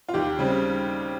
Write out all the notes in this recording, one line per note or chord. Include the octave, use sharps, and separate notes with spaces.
F4
D#2 G4
C#3 G3 C4